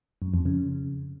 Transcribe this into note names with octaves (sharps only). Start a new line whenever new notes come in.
F#2
F2
C#3